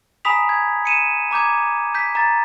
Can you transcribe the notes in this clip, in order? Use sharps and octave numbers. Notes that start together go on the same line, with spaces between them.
G#5 A#5 B5 D#6 B6 F7
G#6
C#7 D#7 E7
A#5 D6 G6 G#6
G6 B6
A#5 A6